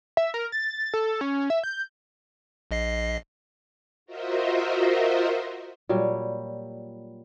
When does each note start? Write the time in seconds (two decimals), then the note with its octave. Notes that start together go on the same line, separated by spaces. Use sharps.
0.17 E5
0.34 A#4
0.52 A6
0.94 A4
1.21 C#4
1.50 E5
1.63 G6
2.71 A#1 D#5 C7
4.06 F4 F#4 A#4 C5 D#5 E5
5.89 A#2 F#3 G3